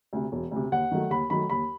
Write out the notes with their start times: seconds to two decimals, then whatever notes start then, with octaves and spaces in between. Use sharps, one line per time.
0.13 D2 C3
0.32 E1
0.51 D2 C3
0.72 D#2 F#5
0.92 D#3 F#3 A3
1.10 D#2 B5
1.30 D#3 F#3 A3 B5
1.50 D#2 B5